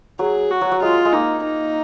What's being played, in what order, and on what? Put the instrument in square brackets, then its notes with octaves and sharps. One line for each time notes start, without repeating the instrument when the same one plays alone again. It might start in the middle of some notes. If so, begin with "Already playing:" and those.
[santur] F#3 [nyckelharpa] G#4
[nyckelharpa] F#4
[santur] F#3
F#3
[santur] G#3 [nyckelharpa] F4
[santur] G#3
[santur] A#3 [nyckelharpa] D#4
[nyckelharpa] D#4